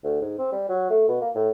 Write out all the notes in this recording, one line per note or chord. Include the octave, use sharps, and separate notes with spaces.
D2
G#2
C4
G3
F#3
A3
B2
A#3
A2